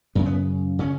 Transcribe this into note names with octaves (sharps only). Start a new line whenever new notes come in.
F#2 C#3 B3
B3
C#3 C#4